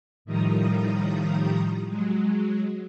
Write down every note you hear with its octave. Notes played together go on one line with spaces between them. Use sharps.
A2 D#3 F3 G3 A#5 D#6
F#3 G#3